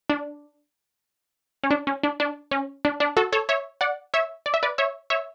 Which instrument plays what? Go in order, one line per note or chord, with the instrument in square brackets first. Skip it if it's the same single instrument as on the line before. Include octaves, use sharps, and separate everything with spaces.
[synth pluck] D4
C#4
D4
C#4
D4
D4
C#4
D4
D4
F#4 A4
A4 C#5
C#5 E5
D5 F#5
C#5 E5
D5
E5
B4 D5
C#5 E5
C#5 E5